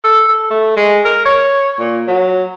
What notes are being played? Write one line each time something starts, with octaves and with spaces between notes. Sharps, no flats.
A4
A4
A3
G#3
A#4
C#5
A#2
F#3